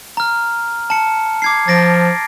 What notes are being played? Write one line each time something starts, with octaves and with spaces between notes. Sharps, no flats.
A#5 F6
A5 C#7
D6 G#6 C7
F3 A6 A#6 D7